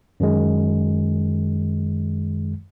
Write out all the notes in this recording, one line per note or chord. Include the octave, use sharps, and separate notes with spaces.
F#2 D#3 G#3